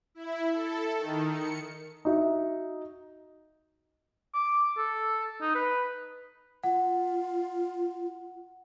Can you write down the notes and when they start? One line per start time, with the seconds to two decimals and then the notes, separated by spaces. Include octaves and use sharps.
0.15 E4
0.52 A4
0.97 D#3
1.31 C#7
2.05 D#4 F#4 E5
4.34 D6
4.78 A4
5.42 D#4
5.55 B4
6.64 F4 F#5